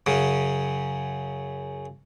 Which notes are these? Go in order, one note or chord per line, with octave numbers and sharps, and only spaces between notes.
F#2 C#3